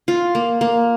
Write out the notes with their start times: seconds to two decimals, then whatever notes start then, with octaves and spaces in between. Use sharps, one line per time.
0.08 F4
0.35 A#3
0.61 A#3